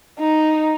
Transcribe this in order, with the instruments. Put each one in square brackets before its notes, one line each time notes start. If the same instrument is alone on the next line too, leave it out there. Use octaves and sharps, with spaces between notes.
[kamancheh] D#4